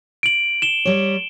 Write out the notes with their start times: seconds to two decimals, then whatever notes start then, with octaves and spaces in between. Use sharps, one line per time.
0.23 D7 F#7
0.62 E7 G7
0.85 G3 C#5